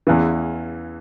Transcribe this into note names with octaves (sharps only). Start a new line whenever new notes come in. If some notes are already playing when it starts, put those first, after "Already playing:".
E2 C#3 E3